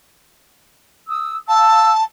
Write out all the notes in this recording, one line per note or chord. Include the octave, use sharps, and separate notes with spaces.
D#6 E6
F5 A5 E6